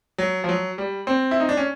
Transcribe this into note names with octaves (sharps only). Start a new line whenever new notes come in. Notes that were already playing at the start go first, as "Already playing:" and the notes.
F#3
F3
F#3
G3
C4
E4
D#4
D4
C#4